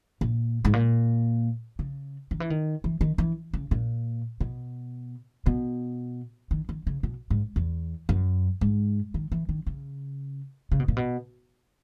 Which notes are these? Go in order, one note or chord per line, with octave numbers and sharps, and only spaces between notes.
A#2
G#2
A#2
C#3
D#3
E3
D#3
E3
D#3
E3
C#3
A#2
B2
B2
D#3
D#3
C#3
B2
G#2
E2
F#2
G#2
D#3
E3
D#3
C#3
C#3
B2
A#2
B2